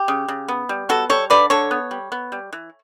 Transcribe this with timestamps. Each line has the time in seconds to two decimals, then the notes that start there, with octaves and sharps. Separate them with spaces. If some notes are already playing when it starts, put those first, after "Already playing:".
Already playing: G4
0.08 C#3
0.28 C#3
0.48 B3
0.69 G3
0.89 B3 F#4 A4
1.10 G3 A4 C#5
1.30 D3 B4 D5
1.50 D3 A4 C#5
1.71 B3
1.91 G3
2.12 B3
2.32 G3
2.53 E3